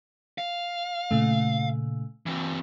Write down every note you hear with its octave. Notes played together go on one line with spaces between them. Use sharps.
F5
A#2 C#3 A3
E3 C4